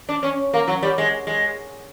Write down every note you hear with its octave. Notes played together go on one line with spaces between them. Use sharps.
D4
C#4
A#3
F#3
G3
G#3
G#3